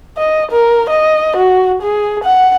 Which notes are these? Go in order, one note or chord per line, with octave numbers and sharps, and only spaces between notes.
D#5
A#4
D#5
F#4
G#4
F#5